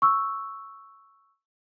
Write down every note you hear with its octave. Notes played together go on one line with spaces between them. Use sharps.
C#6 E6